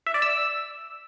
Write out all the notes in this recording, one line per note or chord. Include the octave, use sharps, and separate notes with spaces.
E5
D5
E6